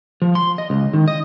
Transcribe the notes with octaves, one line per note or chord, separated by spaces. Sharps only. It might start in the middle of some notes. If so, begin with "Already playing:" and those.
F3
C6
D#5
C#2
D#3
D#5